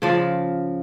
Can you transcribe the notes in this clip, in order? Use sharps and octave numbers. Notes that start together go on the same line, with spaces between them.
C#3 F3 D5